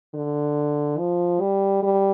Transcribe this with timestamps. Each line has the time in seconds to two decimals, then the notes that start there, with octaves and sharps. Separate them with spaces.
0.14 D3
0.98 F3
1.40 G3
1.83 G3